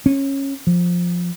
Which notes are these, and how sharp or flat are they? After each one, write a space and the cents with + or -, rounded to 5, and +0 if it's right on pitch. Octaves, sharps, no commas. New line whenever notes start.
C#4 -15
F3 +10